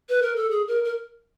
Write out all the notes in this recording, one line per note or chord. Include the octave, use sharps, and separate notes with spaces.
B4
A#4
A4
G#4
A#4
A#4